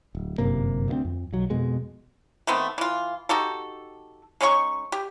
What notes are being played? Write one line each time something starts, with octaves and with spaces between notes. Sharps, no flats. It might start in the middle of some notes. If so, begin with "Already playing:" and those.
D1
G1 F#2 C3 A#3
D2 A#3 C4
F2
B1 F#3
F2 B2 G#3
D#3 A3 B3 C4
E3 F4
D#4 F#4 G4 A4
G#3 C#4 D#4 C#6
G4